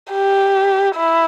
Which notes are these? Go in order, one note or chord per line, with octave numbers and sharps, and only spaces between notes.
G4
E4